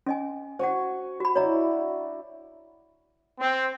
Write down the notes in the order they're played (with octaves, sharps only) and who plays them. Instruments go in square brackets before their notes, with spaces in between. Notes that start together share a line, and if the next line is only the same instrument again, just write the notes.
[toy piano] C#4 D#5 G#5
[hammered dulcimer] F#4 G#5 C#6 [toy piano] C5 F#5
[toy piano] F#4 B5
[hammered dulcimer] D4 E4 F#4 [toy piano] C#5 D#5 A#5
[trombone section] C4